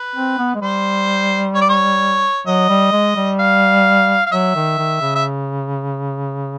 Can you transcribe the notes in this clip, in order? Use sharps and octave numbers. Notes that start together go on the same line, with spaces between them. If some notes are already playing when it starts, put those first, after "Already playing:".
Already playing: B4
C4
B3
G#3
G3 C5
C#5
D5
C#5
F#3 D#5
G3
G#3
G3
F5
F5
F#3 E5
D#3
D#3
C#3
E5